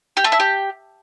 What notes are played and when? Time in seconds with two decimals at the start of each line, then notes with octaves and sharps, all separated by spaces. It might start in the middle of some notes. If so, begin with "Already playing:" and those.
0.17 G4
0.24 A3
0.32 E4
0.40 G4